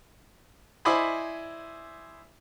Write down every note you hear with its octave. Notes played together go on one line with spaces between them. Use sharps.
E4 C5 D5 D#5 G#5 B5